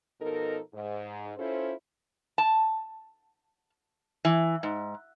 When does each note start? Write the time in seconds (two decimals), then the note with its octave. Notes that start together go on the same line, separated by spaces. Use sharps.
0.21 B2 F3 D#4 A4 A#4
0.74 G#2
1.37 C#4 E4 F4 A4 C5
2.38 A5
4.25 E3
4.63 G#2